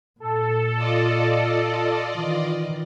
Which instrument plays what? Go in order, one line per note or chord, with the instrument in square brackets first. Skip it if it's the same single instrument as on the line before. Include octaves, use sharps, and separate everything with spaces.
[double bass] A#2 [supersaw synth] A4
[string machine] F4 D5 D#5
[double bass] D#3 E3